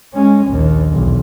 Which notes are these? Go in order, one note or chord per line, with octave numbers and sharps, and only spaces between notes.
G#3 C#4
A#1 D#2
B1 E2